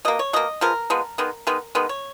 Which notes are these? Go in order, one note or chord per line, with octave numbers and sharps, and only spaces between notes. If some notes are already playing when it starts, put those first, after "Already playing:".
B2 A#3 D#5
C#5
B2 A#3 D#5
F3 G#3 B3 A#4
F3 G#3 B3
D#3 G#3 B3
D#3 G#3 B3
D#3 G#3 B3
C#5